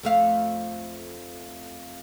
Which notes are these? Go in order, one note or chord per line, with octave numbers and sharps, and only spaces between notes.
F2 A3 F5